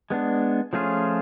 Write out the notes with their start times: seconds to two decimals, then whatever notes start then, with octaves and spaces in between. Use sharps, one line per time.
0.10 G#3 B3 D4
0.73 F3 A3 C#4 F4 G#4